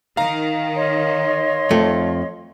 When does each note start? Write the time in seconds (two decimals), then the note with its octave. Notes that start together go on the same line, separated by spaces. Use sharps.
0.17 D#3 F5 A#5
0.76 C#5 D#5 C6
1.71 F2 A3